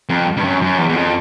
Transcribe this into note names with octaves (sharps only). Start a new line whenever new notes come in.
F2
G2
F#2
F#2
E2
E2
F2